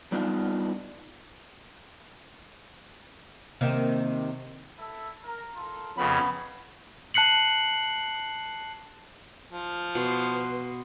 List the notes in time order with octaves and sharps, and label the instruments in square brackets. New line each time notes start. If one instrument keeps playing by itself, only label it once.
[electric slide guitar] G3 B3 D4 D#4 F4
[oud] C3 D#3 A#3
[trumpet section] E4 A4
A#4
F4 A4 A#4
[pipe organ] F2 C#3 [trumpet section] A#3 C#5 F#5 [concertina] B3 B5
[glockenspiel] A5 F#6 C7 C#7 F#7
[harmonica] F3
[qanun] B2 [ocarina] B4 [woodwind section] C6